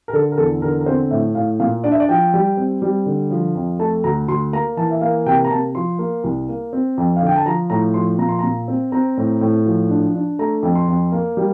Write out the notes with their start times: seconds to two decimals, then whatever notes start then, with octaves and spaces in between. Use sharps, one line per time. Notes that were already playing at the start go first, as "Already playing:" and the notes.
0.08 A#4
0.13 D3 A4
0.32 A#4
0.38 E2 A4
0.62 D3 A#4
0.80 A#4
0.86 C4 C5
1.11 A2 E5
1.35 A2 F5
1.60 A#2 F5
1.84 D4 D5
1.92 E5
2.00 D5
2.09 F3 G5
2.34 G3
2.57 C4
2.82 G3
3.06 D3
3.31 F3
3.55 F2
3.79 A3 A5
4.04 D2 A#5
4.28 D2 C6
4.53 A#3 A#5
4.77 E3 A5
4.91 E5
5.01 A#3 F5
5.26 C3 G5
5.44 A#5
5.51 C3 A5
5.75 F3 C6
5.99 A#3
6.24 C2
6.49 A#3
6.73 C4
6.98 F2
7.16 F5
7.22 D3 G5
7.36 A5
7.46 F3 A#5
7.70 A2 A#5
7.94 F3 C6
8.19 A#2 A#5
8.29 C6
8.39 A#2 A#5
8.68 C4
8.92 C4 A#5
9.17 A2
9.41 A2
9.66 F3
9.90 D4
10.15 D4
10.39 A3 A#5
10.63 F2
10.75 C6
10.88 F2
11.12 A#3
11.37 G3